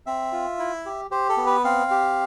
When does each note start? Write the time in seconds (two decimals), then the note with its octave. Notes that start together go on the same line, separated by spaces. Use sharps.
0.06 C4 E5
0.32 F4
0.59 E4
0.86 G4
1.11 G4 C5
1.29 A4
1.37 B3
1.47 B4
1.64 C4 F5
1.91 G4